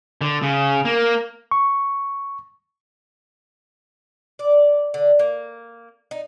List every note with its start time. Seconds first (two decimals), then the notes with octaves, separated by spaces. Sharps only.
0.21 D3
0.42 C#3
0.85 A#3
1.51 C#6
4.39 D5
4.94 D3
5.19 A#3
6.11 D#4